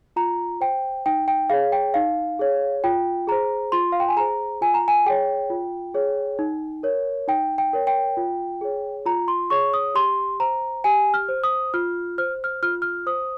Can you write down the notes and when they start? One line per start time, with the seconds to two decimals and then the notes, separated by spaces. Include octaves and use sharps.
0.16 F4 A#5
0.61 C5 G5
1.06 D#4 G5
1.28 G5
1.50 G#4 C#5 F5
1.72 G5
1.94 D#4 F5
2.39 G#4 C#5
2.84 F4 G5
3.27 G#4 C5 A#5
3.72 F4 C6
3.92 F5
4.00 G5
4.09 G#5
4.17 G#4 C5 A#5
4.61 F4 G#5
4.74 A#5
4.88 G#5
5.06 G#4 C#5 G5
5.50 F4
5.94 G#4 C#5
6.39 D#4
6.83 A#4 C#5
7.28 D#4 G5
7.58 G5
7.73 A#4 C#5
7.87 G5
8.17 F4
8.61 G#4 C#5
9.06 F4 A#5
9.28 C6
9.50 G#4 C#5 C#6
9.74 D#6
9.95 G4 C6
10.40 C5 A#5
10.84 G4 G#5
11.14 F6
11.29 C5
11.44 D#6
11.74 F4 F6
12.18 C5 F6
12.44 F6
12.62 F4 F6
12.82 F6
13.06 C5 D#6